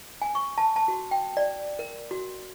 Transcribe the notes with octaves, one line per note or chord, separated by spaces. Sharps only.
G#5
C#6
A5
A5
F#4
G5
D5
A#4
F#4